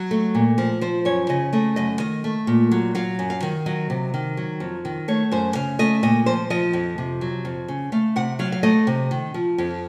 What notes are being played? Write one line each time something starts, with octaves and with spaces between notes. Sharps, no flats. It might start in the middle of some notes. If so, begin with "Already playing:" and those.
Already playing: F#3
A3
A#2
F3
F3 C5
F#2 C#5
C#3 D#5
A3 D#5
F#2 D#5
D#3 D#5
A3
A#2
F#3
F#3 F5
F#2
F5
D#3
F#3 D#5
C3
D#3
F#3
F2
D#3
A3 C#5
F#2 C5
C#3 F5
A3 D#5
A#2 D#5
F3 C5
F3 D#5
F2
C3
F#3
F2
C#3
A3 F5
C3 F#5
F#3 F5
F5
A3 D#5
C3
D#3
F3
F2